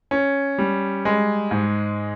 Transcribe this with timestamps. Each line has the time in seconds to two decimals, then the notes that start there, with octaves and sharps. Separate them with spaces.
0.11 C#4
0.58 G3
1.05 G#3
1.51 G#2